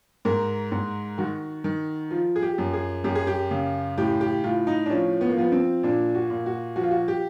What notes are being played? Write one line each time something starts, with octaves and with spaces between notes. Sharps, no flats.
G#2 A#4
G#2
D#3 F#4
D#3
F3 F4
G#4
G4
F#2
G#4
F#2 G4
G#4
G4
C#3
A2 G4
G4
A2 F4
D#4
D4
F3 C#4
B3
A#3
F3 B3
C4
A#2 D4
F#4
A#2
F#4
F3 F#4
F4
F#4
G4